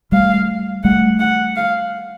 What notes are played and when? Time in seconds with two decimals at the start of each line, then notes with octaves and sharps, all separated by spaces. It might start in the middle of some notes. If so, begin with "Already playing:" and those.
0.12 G3 A3 F5
0.84 G3 A3 F#5
1.20 F#5
1.57 F5